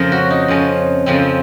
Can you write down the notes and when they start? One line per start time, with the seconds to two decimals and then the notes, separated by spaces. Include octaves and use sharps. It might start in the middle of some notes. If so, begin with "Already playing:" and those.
Already playing: F2 C#3 F3 A#4
0.12 F#4
0.30 D#4
0.48 F2 C#3 F3 C#4
1.06 F2 C#3 F3 C4